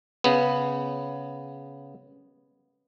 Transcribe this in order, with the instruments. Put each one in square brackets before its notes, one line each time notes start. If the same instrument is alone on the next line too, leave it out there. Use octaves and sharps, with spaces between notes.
[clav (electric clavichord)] C#3 B3